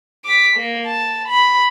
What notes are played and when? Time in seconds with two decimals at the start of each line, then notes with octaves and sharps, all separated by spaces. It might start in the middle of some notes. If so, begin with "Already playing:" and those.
0.25 D6 B6
0.57 A#3
0.87 A5
1.28 B5